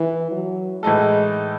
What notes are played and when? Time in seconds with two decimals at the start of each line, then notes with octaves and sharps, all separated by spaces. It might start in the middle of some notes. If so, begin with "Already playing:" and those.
Already playing: E3
0.31 F#3
0.83 A2 E3 G#3 A3 D#4 A4